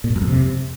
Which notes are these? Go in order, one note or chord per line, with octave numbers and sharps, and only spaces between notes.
A#2
G#2
F#2
F2
C3